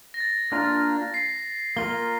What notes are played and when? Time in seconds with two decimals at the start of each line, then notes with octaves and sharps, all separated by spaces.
0.14 A#6
0.20 A6
0.52 A#3 D4 F4 A#4
1.14 C7
1.77 A#3 F4 A#4 G7